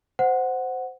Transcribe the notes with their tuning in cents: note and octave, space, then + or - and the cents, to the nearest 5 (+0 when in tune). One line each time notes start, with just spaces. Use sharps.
C5 -10 F#5 +0